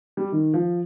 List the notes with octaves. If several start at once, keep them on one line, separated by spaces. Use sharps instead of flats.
G3
D#3
F3